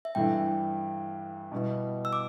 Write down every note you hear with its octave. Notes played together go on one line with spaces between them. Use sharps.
E5
G2 E3 A3 D4 G5
B2 G3 B3 E4
E6
D6